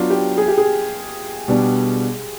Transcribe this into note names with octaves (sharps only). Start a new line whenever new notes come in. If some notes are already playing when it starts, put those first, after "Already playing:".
Already playing: F#3 B3 D4 F4 F#4
G4
G#4
G4
G#4
B2 G3 B3 D4